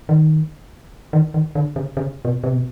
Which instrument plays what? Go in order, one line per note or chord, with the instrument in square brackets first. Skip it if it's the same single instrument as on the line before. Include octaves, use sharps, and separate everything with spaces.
[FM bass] D#3
D#3
D#3
D3
C#3
C#3
B2
C3
B2